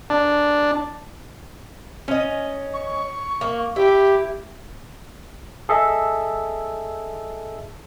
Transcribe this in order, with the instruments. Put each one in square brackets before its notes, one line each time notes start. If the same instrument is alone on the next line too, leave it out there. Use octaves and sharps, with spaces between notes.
[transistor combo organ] D4
[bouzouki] C#4 D#5
[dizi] C#6
[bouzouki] A#3
[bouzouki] E4 [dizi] G4
[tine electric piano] G#4 A4 D#5 E5